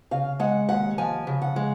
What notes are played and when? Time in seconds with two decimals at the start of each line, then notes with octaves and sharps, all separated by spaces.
0.11 C#3 F5
0.40 G#3 F#5
0.69 D#2 F#5
0.98 F3 G#5
1.27 C#3
1.42 F#5
1.56 G#3